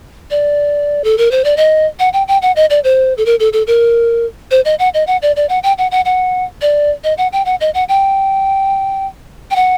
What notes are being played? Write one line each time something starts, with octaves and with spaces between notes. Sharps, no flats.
D5
A4
A#4
C5
D5
D#5
F#5
G5
G5
F#5
D#5
D5
C5
A4
A#4
A4
A4
A#4
C5
D#5
F#5
D#5
F#5
D5
D5
F#5
G5
F#5
F#5
F#5
D5
D#5
F#5
G5
F#5
D#5
F#5
G5
G5
F#5